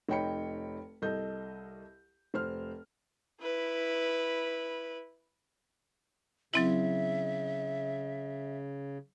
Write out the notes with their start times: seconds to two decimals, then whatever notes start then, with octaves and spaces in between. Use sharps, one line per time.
0.09 F1 D#4 C#5 G5 B5 C#7
1.02 C2 A4 D#5 G6
2.34 F1 C5 F6
3.41 E4 B4
6.54 C#3 F#3 C4 E4 E5